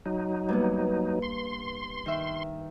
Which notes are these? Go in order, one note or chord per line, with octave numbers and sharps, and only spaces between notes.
F#3 D#4
G2 A#3 B3
C6
D#3 E5